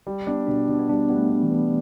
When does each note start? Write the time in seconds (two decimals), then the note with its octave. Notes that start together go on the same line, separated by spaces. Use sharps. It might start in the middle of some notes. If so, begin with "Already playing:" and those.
0.07 G3
0.27 B3 D4
0.47 B2 D4
0.69 B2 D4
0.79 B3
0.89 G3 D4
1.09 G3 B3
1.16 A3
1.30 D4
1.43 E3
1.50 B3